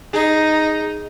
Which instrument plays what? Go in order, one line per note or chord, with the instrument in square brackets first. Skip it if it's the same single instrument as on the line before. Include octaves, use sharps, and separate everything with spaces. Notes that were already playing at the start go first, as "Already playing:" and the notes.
[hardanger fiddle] D#4 [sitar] G#4